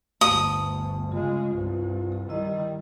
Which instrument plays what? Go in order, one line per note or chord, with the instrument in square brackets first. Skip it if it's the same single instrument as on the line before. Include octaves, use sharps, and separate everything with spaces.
[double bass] G1 D2 [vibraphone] A3 [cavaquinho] D#6
[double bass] C#3 G#3 [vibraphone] F4
[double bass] C2 G2
[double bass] D#3 G3 [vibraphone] E4 D#5